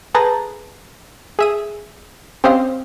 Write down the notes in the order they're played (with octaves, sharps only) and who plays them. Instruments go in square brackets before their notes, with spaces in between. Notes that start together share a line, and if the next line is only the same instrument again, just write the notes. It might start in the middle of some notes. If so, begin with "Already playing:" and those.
[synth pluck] G#4 A4 B4 A5 A#5 G6
G#4 E5 D#6
C4 C#4 G4 C5 D#5 F5